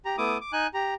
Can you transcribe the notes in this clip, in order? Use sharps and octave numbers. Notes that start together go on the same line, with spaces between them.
G4 A#5
A3 B3 E4 D6 D#6
D6
D#4 G#5 F#6
G4 A#5